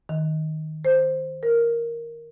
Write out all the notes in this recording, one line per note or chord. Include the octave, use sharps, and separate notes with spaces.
D#3
C5
A#4